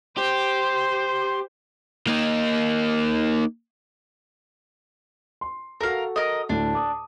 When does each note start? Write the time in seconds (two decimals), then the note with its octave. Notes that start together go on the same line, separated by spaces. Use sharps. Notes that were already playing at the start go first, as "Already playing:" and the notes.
0.17 G4 C5 C6
2.07 A#3 D#4
5.41 C6
5.81 F#4 A4 A#4 F5
6.16 A#4 D#5
6.49 D2 A2 D4
6.75 D6 D#6